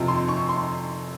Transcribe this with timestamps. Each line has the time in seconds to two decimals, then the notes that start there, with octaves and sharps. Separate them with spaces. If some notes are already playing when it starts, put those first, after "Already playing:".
Already playing: F2 C3 F3
0.08 C6
0.29 C#6
0.49 C6